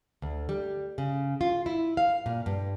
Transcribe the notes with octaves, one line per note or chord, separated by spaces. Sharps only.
D2
G3
C#3
F4
E4
F5
A#2
G2